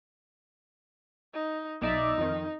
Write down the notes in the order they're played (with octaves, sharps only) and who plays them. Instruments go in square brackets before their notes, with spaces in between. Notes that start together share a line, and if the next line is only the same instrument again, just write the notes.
[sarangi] D#4
[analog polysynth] B1 D5 E5 [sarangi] D#4
[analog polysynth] F2 D#3